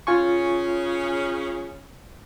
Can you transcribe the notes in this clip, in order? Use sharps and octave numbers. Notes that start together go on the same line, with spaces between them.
C#3 C#4 F4 G#5 C#6